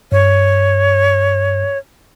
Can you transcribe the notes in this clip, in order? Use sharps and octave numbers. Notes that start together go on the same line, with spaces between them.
G2 C#5